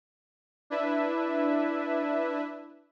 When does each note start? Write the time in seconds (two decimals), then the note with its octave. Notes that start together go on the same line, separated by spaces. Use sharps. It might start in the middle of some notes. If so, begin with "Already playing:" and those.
0.70 D4 E4 B4 E5